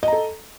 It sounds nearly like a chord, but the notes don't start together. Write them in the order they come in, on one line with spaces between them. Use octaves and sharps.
D#5 A#5 A4